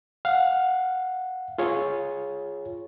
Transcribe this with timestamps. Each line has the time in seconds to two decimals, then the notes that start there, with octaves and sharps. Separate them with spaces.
0.25 F5 F#5
1.58 F4 G#4 C#5